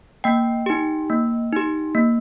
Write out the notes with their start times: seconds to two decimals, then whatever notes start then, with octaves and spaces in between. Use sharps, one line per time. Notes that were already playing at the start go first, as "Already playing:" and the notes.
0.24 A#3 G5
0.66 D#4 G4
1.10 A#3
1.53 D#4 G4
1.95 A#3